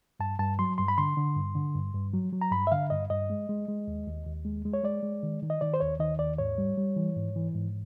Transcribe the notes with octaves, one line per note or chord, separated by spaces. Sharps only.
G2 A5
G2 A5
F#3 C6
G2 C6
B5
D3 C6
D3
G2
D3
G2
G2
F#3
F#3
A#5
G2 B5
E5
D3 F5
G2 D#5
G2 D#5
G#3
G#3
G#3
D#2
D#2
D#2
G#3
G#3
C#5
G#3 D5
G#3
D#3
D#3
D#5
D#3 D5
C5
D#2 C#5
D#3 D#5
D#2 D5
G#2 C#5
G3
G3
E3
G#2
E3
G#2